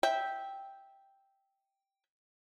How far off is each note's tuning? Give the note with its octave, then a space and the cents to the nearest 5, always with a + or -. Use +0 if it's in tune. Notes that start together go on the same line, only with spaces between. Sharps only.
E5 -15 G5 +0